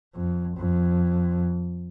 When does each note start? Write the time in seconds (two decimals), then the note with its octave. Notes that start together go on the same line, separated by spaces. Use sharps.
0.15 F2
0.57 F2